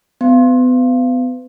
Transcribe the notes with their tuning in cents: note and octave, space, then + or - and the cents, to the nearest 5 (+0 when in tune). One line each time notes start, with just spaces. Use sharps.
B3 +35